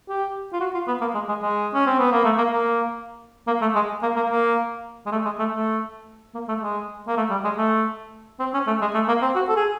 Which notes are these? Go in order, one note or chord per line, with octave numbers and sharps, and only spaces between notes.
G4
F4
F#4
F4
B3
A#3
G#3
G#3
G#3
C#4
C4
B3
A#3
A3
A#3
A#3
A#3
A3
G#3
A#3
A#3
A#3
G#3
A3
G#3
A3
A3
A#3
A3
G#3
A#3
A3
G3
G#3
A3
C4
C#4
A3
G#3
A3
A#3
C4
F#4
A4
G#4